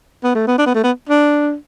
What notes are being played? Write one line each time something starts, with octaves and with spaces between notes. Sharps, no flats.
B3
A3
B3
D4
B3
A3
B3
D4